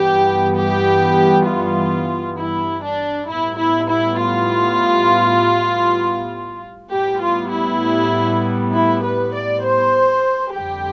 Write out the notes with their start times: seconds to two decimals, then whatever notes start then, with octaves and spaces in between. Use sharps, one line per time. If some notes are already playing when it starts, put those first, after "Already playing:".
Already playing: G2 E3 G3 B3 G4
0.57 G4
1.48 F4
2.39 E4
2.83 D4
3.29 A2 G3 B3 E4
3.59 E4
3.89 E4
4.20 F4
6.92 A2 G3 B3 G4
7.23 F4
7.52 E4
8.74 E4
9.03 B4
9.33 D5
9.64 C5
10.55 F2 D3 G3 C4 G4